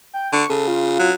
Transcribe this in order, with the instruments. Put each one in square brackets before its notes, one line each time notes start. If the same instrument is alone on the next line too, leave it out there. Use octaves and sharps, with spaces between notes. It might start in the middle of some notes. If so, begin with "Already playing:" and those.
[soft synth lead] G5
[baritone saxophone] D3 [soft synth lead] C#6
[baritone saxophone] C#3 [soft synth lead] A4
[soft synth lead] F4
[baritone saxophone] F#3